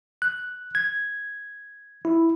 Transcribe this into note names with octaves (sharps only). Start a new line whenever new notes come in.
F#6
G#6
E4